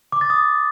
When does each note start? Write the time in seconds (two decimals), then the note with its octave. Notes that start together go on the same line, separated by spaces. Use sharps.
0.12 D6
0.21 A6
0.30 D#6